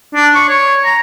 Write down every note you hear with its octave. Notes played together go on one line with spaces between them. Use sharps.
D4
C#6
C#5
A#5